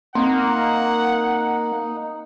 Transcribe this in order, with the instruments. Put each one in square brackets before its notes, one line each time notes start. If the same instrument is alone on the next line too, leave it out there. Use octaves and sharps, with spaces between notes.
[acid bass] A#3 [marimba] C4 [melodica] D#4 [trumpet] F#5